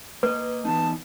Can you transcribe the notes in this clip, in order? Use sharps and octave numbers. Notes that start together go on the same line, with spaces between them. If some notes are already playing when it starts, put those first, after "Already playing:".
A#3 B4 D#5
E3 B3 D#4 A5